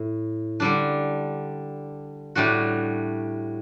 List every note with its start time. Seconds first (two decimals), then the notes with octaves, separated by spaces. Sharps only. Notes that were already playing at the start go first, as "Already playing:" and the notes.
Already playing: A2
0.60 D3 G3 D4
2.35 A2 G3 D4 F#4